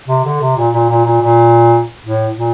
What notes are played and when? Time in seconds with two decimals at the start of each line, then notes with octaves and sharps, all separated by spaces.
0.08 C3
0.25 D3
0.41 C3
0.57 A#2
0.74 A#2
0.90 A#2
1.06 A#2
1.22 A#2
2.04 A2
2.36 A#2